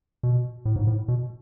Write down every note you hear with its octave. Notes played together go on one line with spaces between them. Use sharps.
B2
A2
G#2
A2
B2